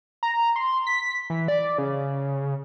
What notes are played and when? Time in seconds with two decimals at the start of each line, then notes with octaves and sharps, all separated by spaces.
0.23 A#5
0.56 C6
0.86 B6
1.30 E3
1.48 D5
1.78 C#3